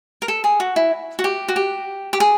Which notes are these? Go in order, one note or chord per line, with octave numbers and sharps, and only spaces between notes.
A#4
A4
G#4
F#4
E4
F#4
G4
F#4
G4
G4
G#4